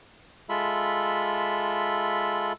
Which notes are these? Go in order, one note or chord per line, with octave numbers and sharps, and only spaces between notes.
G#3 F4 A4 E5 B5